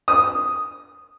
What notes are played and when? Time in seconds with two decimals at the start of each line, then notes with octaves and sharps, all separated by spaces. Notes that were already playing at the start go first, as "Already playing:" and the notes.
0.08 D#6